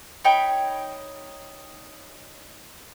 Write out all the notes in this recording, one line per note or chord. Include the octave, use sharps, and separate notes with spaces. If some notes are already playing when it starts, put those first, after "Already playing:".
D#4 C#5 G5 B5